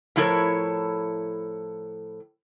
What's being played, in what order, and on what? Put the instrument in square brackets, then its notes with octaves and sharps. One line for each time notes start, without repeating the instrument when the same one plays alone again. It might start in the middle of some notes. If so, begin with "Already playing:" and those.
[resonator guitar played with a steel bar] A2 F3 E4 A4 A#4 C#5